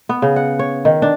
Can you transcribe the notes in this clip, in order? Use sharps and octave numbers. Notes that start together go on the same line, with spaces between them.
B3
C#3
F#5
C#5
D#3
D4